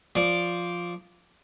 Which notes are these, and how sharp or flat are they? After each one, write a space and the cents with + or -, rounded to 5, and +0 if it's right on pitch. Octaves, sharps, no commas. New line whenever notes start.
F3 +0 D5 -10